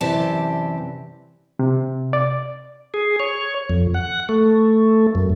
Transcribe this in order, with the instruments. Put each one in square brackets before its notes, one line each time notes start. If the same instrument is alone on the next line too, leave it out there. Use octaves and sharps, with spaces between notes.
[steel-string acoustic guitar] F#2 C3 E3 G4 D5 A5
[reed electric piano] C3
D5
[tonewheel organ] G#4
C#5
F2
F#5
A3
F#2